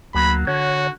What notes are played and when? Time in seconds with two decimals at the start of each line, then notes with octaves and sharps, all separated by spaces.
0.15 D2 F#3 A#3 B5
0.47 D3 F#4 C#5